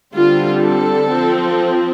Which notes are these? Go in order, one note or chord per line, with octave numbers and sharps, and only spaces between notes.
D3 G3 C4 F4
A4
F3 C4